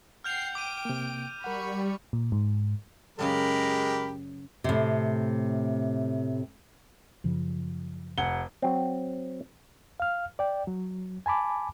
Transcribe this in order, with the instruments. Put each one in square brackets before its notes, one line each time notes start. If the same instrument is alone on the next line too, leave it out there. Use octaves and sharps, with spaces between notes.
[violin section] F#5 G5 C7 [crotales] F6 G6 F7
[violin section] G5 D7 [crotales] D6 D#7
[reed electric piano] C3 A#3
[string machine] G3 [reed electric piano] A#4 F#5 [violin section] B5 C#6
[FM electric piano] A#2
G#2
[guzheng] F#2 C#3 F#3 [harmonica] G#3 G4 A#4 [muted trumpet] B5
[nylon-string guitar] A2 C3
[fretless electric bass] F#2 C#3 F3
[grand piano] F1 F#5 G7
[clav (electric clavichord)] F#3 C4
[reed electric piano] F5 F6
D5 G5
F#3
G#5 A5 B5 D6